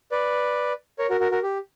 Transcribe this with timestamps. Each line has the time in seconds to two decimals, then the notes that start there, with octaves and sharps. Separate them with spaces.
0.12 B4 D5
0.99 A#4 C#5
1.10 F#4 A#4
1.20 F#4 A#4
1.31 F#4 A#4
1.43 G4